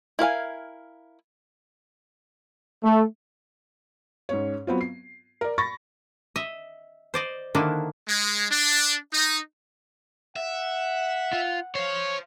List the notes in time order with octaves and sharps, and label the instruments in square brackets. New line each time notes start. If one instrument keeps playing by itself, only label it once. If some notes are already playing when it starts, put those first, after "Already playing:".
[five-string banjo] E4 A#4 F5 G#5
[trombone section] A3
[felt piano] G#2 C#4 C#5
F#3 B3 C4 F4
C7
A#4 D5
B5 C#6 A6 A#6
[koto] D#5 E5
C5 D5 D#5
D3 D#3 A#3 D4 E4
[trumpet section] G#3
D4
D#4
[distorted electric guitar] E5 [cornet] F#5
[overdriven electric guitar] F4
[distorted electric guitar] C5 F5 [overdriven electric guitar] C#5